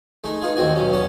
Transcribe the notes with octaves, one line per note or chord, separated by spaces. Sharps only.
G#3 A3 D#4
B3 D#4 F4 G#4
D#2 G#2 D#3 C4 F#4 G#5
G2 B2 F#3 C#4
E2 B3 C#4 A5